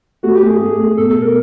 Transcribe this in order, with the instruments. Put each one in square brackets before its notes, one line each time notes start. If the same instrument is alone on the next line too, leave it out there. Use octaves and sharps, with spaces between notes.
[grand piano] A3 [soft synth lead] F#4
[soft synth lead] G4
[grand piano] A3
[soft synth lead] G#4
[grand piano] A3
A3
[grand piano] B2 [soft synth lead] A4
[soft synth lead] A4
[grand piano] B2
[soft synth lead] A#4